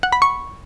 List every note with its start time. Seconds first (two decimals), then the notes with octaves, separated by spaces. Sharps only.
0.03 F#5
0.12 B5
0.22 C#6